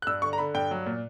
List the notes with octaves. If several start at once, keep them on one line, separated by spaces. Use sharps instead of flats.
F#6
G2 E6
D3 C#6
A#5
D3 B5
G2 G5
F#3
A#2